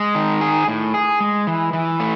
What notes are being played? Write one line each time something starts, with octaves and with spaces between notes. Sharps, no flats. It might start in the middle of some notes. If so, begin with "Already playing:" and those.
Already playing: G#3
D#3
G#4
A2
G#4
G#3
E3
E3
A3